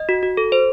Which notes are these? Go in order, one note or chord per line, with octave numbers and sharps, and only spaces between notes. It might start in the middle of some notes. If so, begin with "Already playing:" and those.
Already playing: D#5
F#4
F#4
A4
C5